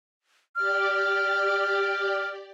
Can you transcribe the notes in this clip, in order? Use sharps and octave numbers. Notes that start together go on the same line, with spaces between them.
G4 D5 F6